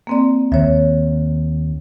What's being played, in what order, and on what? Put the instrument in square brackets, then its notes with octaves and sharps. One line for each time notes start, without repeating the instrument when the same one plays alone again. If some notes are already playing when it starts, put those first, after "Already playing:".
[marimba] A#3 C4 D5
[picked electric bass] D#2 [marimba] C#5 E5